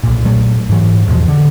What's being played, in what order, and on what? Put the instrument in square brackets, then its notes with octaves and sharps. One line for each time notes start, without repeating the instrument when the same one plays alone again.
[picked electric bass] B1 A#2
A#2 F#3 A3
G#2 E3 F#3
A1 E2 B2 F3
D3